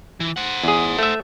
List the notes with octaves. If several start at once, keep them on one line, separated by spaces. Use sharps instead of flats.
E3
C5 F#5
E2 G#4
A3 E5